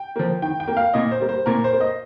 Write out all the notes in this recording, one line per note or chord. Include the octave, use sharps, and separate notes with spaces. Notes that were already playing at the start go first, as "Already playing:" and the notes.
Already playing: G5
F3 A#3
D#3 G5
G5
A#3
F5
A#2 D#5
C5
G3 A#3
C5
A#2 A#4
C5
A#3
D#5